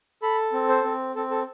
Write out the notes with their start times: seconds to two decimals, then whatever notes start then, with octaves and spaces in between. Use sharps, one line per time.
0.22 A4 B5
0.53 C4
0.69 C5
0.84 C4
1.16 C4 A4
1.31 A4